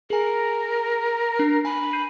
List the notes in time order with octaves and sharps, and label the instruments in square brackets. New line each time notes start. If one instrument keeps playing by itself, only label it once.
[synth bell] G#4 G#5 [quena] A#4
[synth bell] D4
[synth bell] G#5 [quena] B5
[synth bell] G6 C7 D#7